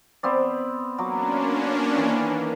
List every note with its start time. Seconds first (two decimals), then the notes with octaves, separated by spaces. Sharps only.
0.23 B3 C4 D5
0.98 F#3 A#3 C#4 D4 D6
1.95 D#3 E3